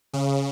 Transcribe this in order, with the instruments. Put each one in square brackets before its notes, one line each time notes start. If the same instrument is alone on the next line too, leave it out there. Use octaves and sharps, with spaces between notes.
[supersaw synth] C#3